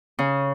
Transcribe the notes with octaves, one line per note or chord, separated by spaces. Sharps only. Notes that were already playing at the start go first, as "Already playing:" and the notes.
C#3